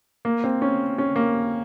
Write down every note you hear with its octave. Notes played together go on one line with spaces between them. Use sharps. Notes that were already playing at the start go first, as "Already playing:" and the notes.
A#3
C4
C#4
C#4
A#3